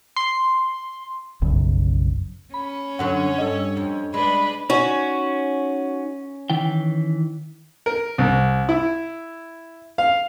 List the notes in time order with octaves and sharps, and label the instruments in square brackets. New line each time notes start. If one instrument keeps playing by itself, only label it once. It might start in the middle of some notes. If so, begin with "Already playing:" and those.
[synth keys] C6
[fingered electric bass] F1 B1 F#2 C#3
[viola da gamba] C#4 [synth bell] B5
[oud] F#2 D3 F#3 [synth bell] F#5
[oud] G2 A4 [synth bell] D#5
[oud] F2
[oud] G#3 [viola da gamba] D4 B4 [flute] B5
[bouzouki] C#4 [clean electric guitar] D#4 F#4
[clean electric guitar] D#3 E3 G5
[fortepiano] A#4
C2
E4
F5